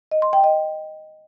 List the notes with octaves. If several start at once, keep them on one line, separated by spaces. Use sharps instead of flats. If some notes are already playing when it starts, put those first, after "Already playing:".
D#5
C6
G5
D#5